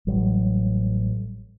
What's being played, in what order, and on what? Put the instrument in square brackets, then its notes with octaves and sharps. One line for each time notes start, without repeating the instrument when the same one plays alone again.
[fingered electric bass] A1 F#3 G3